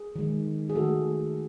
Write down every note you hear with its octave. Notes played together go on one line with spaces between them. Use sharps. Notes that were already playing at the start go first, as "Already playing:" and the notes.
Already playing: G#4
D#3 G#3
G#4
D#3 A3 F#4 A4